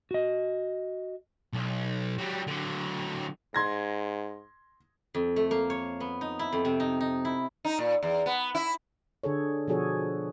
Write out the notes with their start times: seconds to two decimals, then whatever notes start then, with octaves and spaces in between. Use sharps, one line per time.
0.11 F#4 D#5
1.53 B1
2.18 F#3 G3
2.47 D3 F#3
3.54 G#2 C6 G#6 A#6
5.15 F2
5.36 A3
5.51 A#3
5.70 C#5
6.00 B3
6.21 D#4
6.39 E4
6.52 F2
6.65 C3
6.80 D#4
7.01 D#4
7.25 E4
7.65 D#4
7.79 A#2
8.03 E2
8.26 B3
8.55 E4
9.24 D3 G#4 A4 C#5
9.68 B2 F3 F#4 G#4 A4 C#5